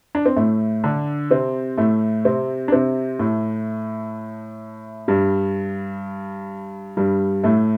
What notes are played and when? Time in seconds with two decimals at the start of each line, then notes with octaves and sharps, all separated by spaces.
0.15 D4
0.26 C4
0.37 A2 A3
0.84 D3 D4
1.30 C3 C4
1.78 A2 A3
2.25 C3 C4
2.68 D4
2.72 C3 C4
3.19 A2 A3
5.08 G2 G3
6.97 G2 G3
7.44 A2 A3